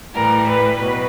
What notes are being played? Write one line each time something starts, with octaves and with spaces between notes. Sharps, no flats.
A2 E3 G3 A#4
B4
B2 F#3 B4